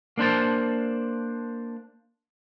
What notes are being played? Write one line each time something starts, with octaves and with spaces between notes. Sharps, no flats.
A#3 D4 C5 A5